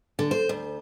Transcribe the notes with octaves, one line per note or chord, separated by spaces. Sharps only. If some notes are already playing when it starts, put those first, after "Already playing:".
D3
C5
D2